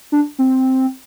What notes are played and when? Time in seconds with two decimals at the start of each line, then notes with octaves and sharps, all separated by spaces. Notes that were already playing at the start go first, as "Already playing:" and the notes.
0.12 D4
0.39 C4